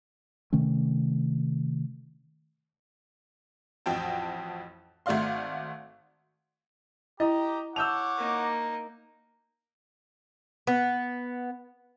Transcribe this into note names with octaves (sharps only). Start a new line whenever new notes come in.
C3 D#3 A3 C#4
A1 F2 F#4 G5 A5
G#1 A3 F#4 D5 F5 C6
E4 G4 D#5 A#5
C#5 F#5 A5 D6 E6 G6 F7
A#3 D#4
B3